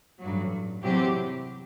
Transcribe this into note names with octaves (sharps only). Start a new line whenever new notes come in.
A1 G2 F#3
E2 C3 F#3 C4 G4